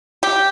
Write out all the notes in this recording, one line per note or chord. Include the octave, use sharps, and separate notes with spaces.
G4